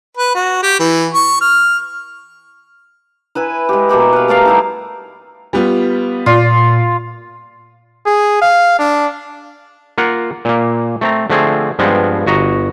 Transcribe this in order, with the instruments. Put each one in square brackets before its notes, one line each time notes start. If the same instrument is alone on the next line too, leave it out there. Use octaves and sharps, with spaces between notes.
[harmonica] B4
F#4
G4
E3
C#6
F6
[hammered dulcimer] E4 B4 G#5
G#3 G4
B2 A#3 G4 B5
B4 F5
A3 A#4 D5 F5
G3 D#4 E4
[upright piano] G3 B3 F4
[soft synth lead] A#2 [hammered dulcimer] F4 [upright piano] D5
[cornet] G#4
F5
D4
[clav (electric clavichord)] A#3 F4 A#4 F#5
A#2 A#3
A3 C4 A#5
D3 F3 A3 C4 G#4
G2 F3 G#3 B3 C4
G1 F#4 D#5 A#5